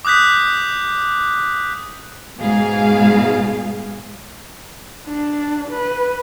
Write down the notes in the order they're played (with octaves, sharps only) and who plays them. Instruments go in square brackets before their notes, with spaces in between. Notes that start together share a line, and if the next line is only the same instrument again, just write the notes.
[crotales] D6 D#6 F#6 G6 B6
[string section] G#2 B2 G#4 F5
[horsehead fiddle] D4
B4